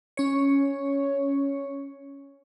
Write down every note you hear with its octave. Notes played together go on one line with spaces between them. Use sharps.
C#4 C#5